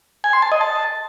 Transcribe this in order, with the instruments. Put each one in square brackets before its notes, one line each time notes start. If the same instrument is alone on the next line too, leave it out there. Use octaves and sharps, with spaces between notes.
[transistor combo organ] G#5
C6
A5
D#5
A5